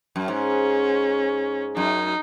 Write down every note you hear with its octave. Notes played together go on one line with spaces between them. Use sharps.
F#2
G#2 C#4
F#2 D#4